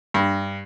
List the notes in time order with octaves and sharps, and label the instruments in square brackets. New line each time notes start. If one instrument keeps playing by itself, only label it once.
[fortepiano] G2